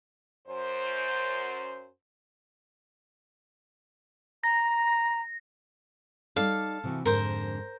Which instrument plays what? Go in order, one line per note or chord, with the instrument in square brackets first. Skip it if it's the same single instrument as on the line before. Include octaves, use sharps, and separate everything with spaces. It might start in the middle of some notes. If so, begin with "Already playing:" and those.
[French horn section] F#2 C5
[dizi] A#5 [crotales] A#6
[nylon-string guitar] G3 D#4 D5 [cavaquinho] A4 F5
[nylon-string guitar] C3 E3 F#4
[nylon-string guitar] F2 G#2 D3 [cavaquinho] A#4 C5